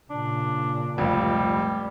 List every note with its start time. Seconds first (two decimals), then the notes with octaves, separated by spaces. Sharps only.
0.10 A#2 C#3 D4
0.98 F1 C#2 G3